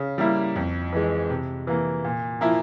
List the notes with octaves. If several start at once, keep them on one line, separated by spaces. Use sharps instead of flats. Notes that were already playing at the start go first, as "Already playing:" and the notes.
Already playing: C#3
G3 A#3 E4
F2
E3 G#3
C3
E3 A#3
A#2
F3 A#3 E4